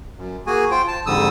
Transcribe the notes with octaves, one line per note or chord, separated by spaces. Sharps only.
F#2
A#3 F#4 G#4 G#5
F4 C5 G5
A5
F2 G#2 D3 G3 D#6 E6